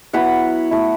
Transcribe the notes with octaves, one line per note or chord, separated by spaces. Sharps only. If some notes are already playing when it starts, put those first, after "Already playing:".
F#3 B3 E4 F#5 B5
A3 E4